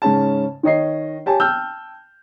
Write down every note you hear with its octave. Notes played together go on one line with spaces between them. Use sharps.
G#2 C#3 C#4 A5
D#3 C#5 D#5 C7
G4 C#5 G#5 A5
G5 A5 E6 F6 G6